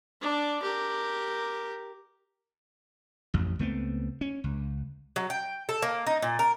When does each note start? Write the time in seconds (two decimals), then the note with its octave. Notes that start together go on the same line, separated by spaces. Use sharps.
0.21 D4 D5
0.62 G4 A#4
3.34 A1 F2
3.59 C#2 A3 B3 C4
4.21 C#4
4.44 C#2
5.16 F#3
5.30 G5
5.69 A4
5.82 A#3
6.07 D#4
6.22 A#2
6.39 A#4